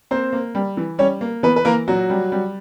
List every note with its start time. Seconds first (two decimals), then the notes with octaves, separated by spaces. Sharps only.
0.11 A#3 C4 C5
0.33 A#3
0.55 G3
0.77 E3
0.99 G3 C#4 C#5
1.21 A#3
1.43 E3 B3 B4
1.56 B4
1.65 E3 A#3 A#4
1.88 A#2 F#3 F#4
2.10 G3
2.32 G3